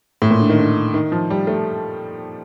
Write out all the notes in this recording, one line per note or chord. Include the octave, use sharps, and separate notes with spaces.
A2
A#2
D3
D#3
D3
D#3
F3
G3
A3